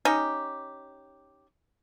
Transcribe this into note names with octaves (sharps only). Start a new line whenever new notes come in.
C#4 D#4 G4